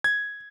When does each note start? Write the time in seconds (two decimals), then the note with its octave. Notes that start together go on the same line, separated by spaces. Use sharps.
0.04 G#6